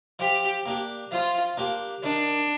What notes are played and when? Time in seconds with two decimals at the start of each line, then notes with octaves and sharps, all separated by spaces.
0.19 F3 G4
0.66 A#3 D4 G4
1.12 F3 F4
1.57 A#3 D4 G4
2.03 D#3 D4